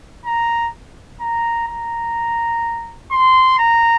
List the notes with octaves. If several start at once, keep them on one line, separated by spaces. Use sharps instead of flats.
A#5
A#5
A#5
C6
A#5